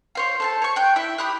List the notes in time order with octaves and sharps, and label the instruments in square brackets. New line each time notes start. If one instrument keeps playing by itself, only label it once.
[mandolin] F4 C5 C#5
A4 C5 A5
C#5 C#6
G5 F#6 G6
E4 E5
G4 B5 D#6 F#6